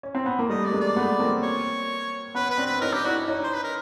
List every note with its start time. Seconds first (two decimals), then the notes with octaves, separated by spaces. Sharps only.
0.03 C#4
0.15 C4
0.26 B3
0.39 A#3
0.49 G3 A3 D#5
0.65 D5
0.73 G#3 A#3
0.81 D5
0.97 A3 B3
1.19 A#3 C4
1.43 C#5
2.35 B3 C#4 B4
2.50 B4
2.58 C4 D4
2.66 B4
2.81 C#4 D#4 A#4
2.93 G4
3.04 D4 E4 F#4
3.28 C#4 D#4
3.44 C5
3.54 B4
3.64 A#4